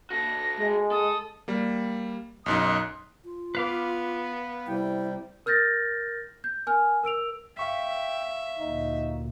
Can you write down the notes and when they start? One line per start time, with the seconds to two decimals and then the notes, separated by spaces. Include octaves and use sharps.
0.10 F#4 A4 A#6
0.59 G#3
0.91 A4 D#6
1.48 G3 A#3
2.46 B1 F#2 D#4 C6 D#6 F#6
3.25 F4
3.55 B3 B4 F5 D6
4.67 C3 G3 E4 G5
5.46 A#4 F6 G6 A6 A#6
6.44 G6
6.67 A#4 G#5 F6
7.03 A#4 E6 D7 F7
7.57 E5 F5 G5 C#6 B6
8.59 D2 A#2 D#4